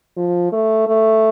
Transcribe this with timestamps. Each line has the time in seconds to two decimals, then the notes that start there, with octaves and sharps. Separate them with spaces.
0.16 F3
0.52 A3
0.88 A3